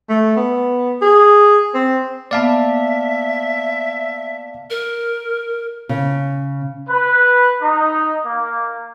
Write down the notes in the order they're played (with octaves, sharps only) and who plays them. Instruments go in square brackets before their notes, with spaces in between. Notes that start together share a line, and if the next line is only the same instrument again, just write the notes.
[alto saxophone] A3
B3
G#4
C4
[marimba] A#3 B3 [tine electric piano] D5 F5 A5 [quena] E5
[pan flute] A#4
[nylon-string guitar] C#3
[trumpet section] B4
D#4
A#3